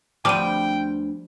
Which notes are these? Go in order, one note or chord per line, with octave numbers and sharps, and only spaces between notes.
D2 F3 G3 B3 C4 G5 D6 D#7